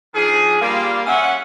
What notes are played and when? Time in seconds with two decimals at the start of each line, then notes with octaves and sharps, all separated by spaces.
0.15 D#3 F3 D4 G#4
0.61 G3 A#3 F4
1.07 C#4 E5 F#5